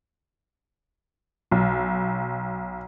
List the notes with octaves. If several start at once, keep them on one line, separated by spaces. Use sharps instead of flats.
B1